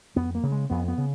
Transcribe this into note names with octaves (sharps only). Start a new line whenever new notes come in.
F2 B3
A#3
C#3
G#3
F2 B3
B3
C#3